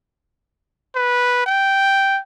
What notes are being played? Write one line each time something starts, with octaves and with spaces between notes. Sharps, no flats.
B4
G5